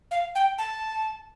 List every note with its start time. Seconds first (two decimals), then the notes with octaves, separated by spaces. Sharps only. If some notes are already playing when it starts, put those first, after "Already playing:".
0.11 F5
0.35 G5
0.58 A5